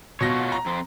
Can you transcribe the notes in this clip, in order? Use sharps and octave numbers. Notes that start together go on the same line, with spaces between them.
B2 F4 F#4 C#5 A#6
A#5
F2 C4